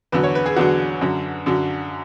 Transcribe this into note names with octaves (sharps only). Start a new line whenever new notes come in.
E2 D3 F#3 B4
C#5
B4
G#4
E2 D3 F#3 F#4
F#2 D3 F#3
F#2 D3 F#3